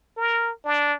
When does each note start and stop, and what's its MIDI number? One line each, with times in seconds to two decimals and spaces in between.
0.17 0.52 70
0.65 0.94 62